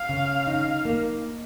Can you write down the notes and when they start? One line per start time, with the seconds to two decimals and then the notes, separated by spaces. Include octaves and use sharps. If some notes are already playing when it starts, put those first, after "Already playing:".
Already playing: F5
0.09 C#3
0.47 D#4
0.85 A#3